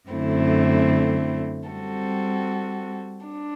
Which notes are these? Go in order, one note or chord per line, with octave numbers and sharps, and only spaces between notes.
F#2 D3 A3 C4 E4
G3 C4 F#4 A4
D4